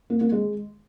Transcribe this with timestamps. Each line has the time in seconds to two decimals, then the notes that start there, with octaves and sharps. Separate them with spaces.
0.10 A#3
0.21 A#3
0.32 G#3